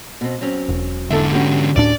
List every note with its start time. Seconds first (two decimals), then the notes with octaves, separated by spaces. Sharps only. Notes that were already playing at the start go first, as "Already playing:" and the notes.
0.21 B2 C4
0.41 F#3 C4 C#4
0.69 E1
1.10 G#2 D3 E4 A4 E5
1.32 C#4 F#4 G4
1.76 D1 A2 D4 D5